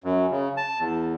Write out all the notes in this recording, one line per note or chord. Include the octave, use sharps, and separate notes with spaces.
F#2
C#3
A5
E2